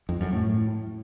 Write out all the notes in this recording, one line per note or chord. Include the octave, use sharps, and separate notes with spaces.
F2
F#2
A2